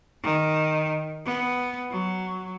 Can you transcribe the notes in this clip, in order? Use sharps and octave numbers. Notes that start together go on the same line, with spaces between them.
D#3
B3
F#3